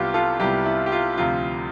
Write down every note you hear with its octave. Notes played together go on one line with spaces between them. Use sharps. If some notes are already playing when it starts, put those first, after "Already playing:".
Already playing: C2 C3 G3 B3 F4 G4
F4 A4
C2 C3 G3 B3 E4 G4
E4
G4
F4
D2 C3 F3 F4